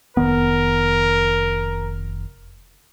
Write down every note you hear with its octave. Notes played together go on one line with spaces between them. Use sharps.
F1 D#3 B3 A#4